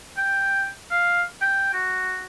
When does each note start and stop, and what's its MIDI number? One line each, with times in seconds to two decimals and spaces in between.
0.17 0.66 79
0.91 1.22 77
1.42 1.70 79
1.74 2.26 66